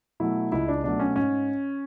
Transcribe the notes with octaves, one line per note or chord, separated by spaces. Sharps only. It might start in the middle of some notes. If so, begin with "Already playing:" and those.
B2 F#3 A3 E4
C#2 E4
D4
B2 F#3 A3 D4
C#4
G#2 C#4